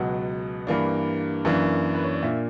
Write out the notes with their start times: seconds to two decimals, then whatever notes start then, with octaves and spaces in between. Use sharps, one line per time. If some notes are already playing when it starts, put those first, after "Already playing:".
Already playing: C#2 B2 F#3 F#5
0.67 G2 E3 A#3 D4
1.45 F#2 E3 A#3 D4
1.95 B4
2.04 C#5
2.14 D5
2.23 A#2 A#3 D4 E5